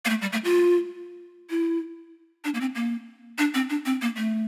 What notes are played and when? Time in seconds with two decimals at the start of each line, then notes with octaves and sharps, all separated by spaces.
0.05 A#3
0.10 A3
0.21 G3
0.33 A3
0.45 F4
1.50 E4
2.45 D4
2.54 A#3
2.61 C4
2.75 A#3
3.38 D4
3.54 C4
3.70 D4
3.86 C4
4.02 A#3
4.17 A3